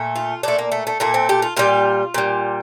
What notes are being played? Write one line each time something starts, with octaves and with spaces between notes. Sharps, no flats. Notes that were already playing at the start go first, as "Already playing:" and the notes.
Already playing: A#2 A3
F4
A#2 A3 D4
A#3
A3
A3
A#2 A3 A#3
C4
G4
F4
A#2 G3 F4
A#2 G3